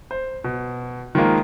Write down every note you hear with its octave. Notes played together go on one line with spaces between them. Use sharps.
C5
B2
D#3 F3 G#3 A#3